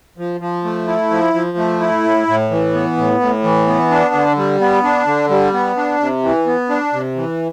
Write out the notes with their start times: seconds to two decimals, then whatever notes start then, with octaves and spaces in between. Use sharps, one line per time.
0.18 F3
0.41 F3
0.64 A3
0.87 E4
1.11 F3
1.34 F3
1.57 A3
1.80 E4
2.04 A2
2.27 A2
2.51 E3
2.74 B3
2.97 A2
3.20 A2
3.44 E3
3.67 B3
3.90 D4
4.14 D3
4.37 G3
4.60 B3
4.83 D4
5.07 D3
5.30 G3
5.53 B3
5.77 D4
6.00 C3
6.23 E3
6.47 B3
6.69 D4
6.93 C3
7.16 E3